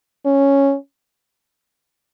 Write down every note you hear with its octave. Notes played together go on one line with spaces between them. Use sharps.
C#4